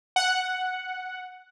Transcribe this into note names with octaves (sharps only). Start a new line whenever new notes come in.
F#5